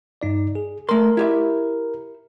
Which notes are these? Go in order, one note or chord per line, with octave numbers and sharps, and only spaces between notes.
G2 D#4 D5
G#4
A3 A#4 C6
E4 G4 E5